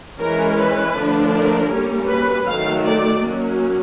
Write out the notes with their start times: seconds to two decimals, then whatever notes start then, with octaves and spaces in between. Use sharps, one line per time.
0.19 E3 G#3 C#4 A#4
0.57 B4
0.95 D3 F3 A3 D4
1.33 A#4
1.70 G3 A#3 C#4
2.08 B4
2.46 D#3 F#3 A3 F5
2.83 D5
3.21 F#3 A#3 C#4